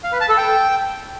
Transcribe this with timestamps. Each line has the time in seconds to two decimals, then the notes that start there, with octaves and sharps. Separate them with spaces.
0.04 F5
0.12 B4
0.21 A5
0.29 A4
0.37 G5